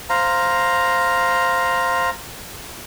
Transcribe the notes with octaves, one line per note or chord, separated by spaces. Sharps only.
C5 F5 A#5